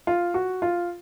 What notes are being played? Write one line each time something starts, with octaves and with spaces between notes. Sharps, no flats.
F4
F#4
F4